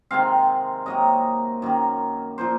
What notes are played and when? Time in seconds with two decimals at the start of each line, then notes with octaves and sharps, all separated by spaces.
0.11 C3 D#3 G#3 C4 F5
0.86 C3 F#3 A#3 D#5
1.62 F#2 D#3 A#3
2.38 A#2 F3 A#3 C5